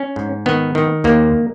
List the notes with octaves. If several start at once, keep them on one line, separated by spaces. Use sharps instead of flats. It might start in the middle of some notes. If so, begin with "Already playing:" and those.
Already playing: C#4
G#2
D#3 B3
D#3
D#2 A#3